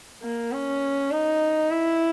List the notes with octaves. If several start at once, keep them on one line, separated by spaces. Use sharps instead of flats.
A#3
C#4
D#4
E4